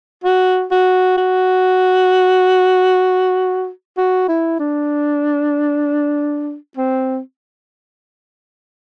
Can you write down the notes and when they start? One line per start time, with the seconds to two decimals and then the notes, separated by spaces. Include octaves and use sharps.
0.24 F#4
0.71 F#4
1.17 F#4
3.97 F#4
4.28 E4
4.60 D4
6.77 C4